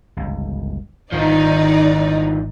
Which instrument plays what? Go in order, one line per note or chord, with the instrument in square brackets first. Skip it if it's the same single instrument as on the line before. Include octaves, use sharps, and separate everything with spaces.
[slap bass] G1 C#2
[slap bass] G#1 D3 [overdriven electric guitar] D#3 F3 [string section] D#4 D5